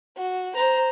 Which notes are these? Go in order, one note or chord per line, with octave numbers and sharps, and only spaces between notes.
F#4
C5 A#5